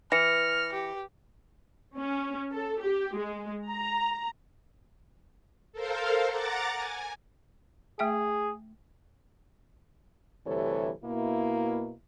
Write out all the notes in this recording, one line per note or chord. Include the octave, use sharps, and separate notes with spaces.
E3 F6 A#6 C#7
G4
C#4
A4
G4
G#3
A#5
A4 A#4 C5 F5
F#5 A#5 D6 A6
G#5
A3 G#4 E5 G5
D2 G2 C3 E3 A4 C#5
B2 A#3 E4